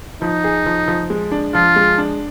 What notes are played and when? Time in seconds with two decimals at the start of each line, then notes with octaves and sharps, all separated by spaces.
0.21 F3 D#4
0.44 G#4
0.66 F3
0.88 F3
1.10 G#3
1.32 D4
1.54 F3 F4
1.76 G#3
1.98 D4